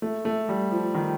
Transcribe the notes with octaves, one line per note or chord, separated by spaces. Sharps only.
A3
A3
G3
F3
D#3